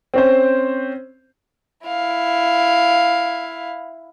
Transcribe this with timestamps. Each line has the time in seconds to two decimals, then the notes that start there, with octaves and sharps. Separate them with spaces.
0.14 C4 C#4 C5
1.87 E4 F5